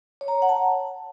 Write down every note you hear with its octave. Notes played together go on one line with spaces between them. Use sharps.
C#5
A#5
C#5
F#5
A5